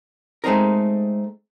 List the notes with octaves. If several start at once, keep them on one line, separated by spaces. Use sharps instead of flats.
G#3 A3 C4 D#4 A#4